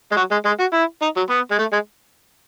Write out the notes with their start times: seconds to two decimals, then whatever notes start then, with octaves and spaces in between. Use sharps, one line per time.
0.12 G#3
0.16 F#3
0.31 G#3
0.45 G#3
0.60 F#4
0.73 E4
1.02 D#4
1.16 F#3
1.30 B3
1.51 G#3
1.59 A3
1.72 G#3